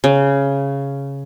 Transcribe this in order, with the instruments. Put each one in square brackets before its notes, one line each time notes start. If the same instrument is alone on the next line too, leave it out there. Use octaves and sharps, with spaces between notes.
[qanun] C#3